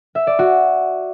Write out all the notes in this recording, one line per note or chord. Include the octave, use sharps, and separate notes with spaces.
E5
D5
F#4